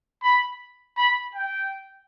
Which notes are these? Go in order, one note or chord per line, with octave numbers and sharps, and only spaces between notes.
B5
B5
G5